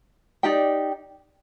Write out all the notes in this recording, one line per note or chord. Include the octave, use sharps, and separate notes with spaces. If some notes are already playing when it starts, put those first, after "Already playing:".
D#4 G4 D5 G5